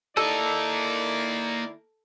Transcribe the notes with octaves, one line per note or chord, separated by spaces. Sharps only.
D#3 A#3 E4 A4 D5 D#5